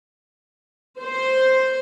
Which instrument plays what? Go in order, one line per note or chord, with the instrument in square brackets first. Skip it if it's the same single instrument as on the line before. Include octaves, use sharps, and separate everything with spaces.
[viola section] C5